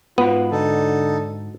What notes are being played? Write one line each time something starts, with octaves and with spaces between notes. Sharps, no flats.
G#2 B3 F4 F#4 B5
D3 D#4 A4